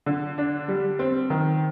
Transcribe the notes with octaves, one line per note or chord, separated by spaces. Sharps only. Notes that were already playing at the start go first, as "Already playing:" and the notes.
D3
D4
G3
C4
D#3